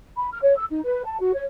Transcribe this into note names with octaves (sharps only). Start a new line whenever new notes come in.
B5
F6
C#5
E6
D#4
B4
A5
F#4
C#5